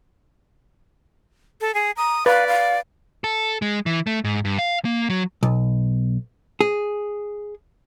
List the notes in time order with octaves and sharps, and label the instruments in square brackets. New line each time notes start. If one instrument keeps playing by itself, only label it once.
[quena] A4
G#4
[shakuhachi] A#5 [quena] D#6
[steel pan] B4 [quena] D5 [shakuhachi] F5
[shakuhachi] F5
[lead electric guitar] A4
G#3
E3
A3
G#2
G2
F5
A#3
F#3
[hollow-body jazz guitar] B1
G#4